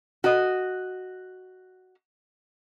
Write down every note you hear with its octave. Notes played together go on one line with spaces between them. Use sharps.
F#4 D#5